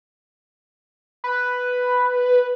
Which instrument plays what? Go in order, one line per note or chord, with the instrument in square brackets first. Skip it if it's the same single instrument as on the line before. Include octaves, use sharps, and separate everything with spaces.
[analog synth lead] B4